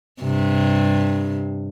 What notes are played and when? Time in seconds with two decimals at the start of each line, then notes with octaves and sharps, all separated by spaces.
0.21 G2 C3